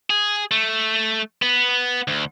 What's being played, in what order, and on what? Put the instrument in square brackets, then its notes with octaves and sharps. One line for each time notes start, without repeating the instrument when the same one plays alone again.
[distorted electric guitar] G#4
A3
B3
D2